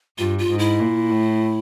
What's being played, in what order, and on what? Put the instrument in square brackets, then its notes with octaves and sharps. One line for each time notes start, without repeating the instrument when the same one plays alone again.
[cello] G2 [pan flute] F4
[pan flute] F4
[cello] G#2
[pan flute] E4
[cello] A#2
A2